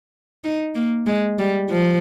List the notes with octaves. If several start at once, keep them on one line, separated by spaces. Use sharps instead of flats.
D#4
A#3
G#3
G3
F3